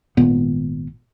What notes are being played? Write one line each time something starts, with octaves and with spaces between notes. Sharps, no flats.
G#1 A#2 D#3 B3